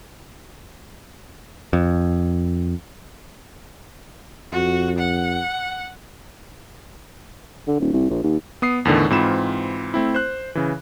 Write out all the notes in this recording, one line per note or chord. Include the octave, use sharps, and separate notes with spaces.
F2
F2 F#4
F#5
D3
D#1
C2
A#1
D#2
B3 D#6 C7
E2 A2 D3 D#3
G#2 E3 C4 F4 B5 E7
A3 C4 E4
C5 F#6
C#3 E3